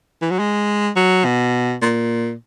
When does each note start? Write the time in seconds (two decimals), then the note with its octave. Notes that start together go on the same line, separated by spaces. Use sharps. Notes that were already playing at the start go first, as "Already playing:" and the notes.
0.22 E3
0.31 F#3
0.39 G#3
0.96 F#3
1.25 B2
1.82 A#2